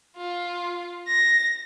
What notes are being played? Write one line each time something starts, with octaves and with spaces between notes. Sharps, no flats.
F4
A#6